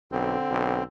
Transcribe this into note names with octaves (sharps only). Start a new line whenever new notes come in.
B1 D3 C4
B1